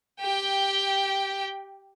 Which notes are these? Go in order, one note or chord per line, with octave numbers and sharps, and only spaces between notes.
G4 G5